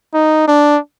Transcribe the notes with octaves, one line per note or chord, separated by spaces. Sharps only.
D#4
D4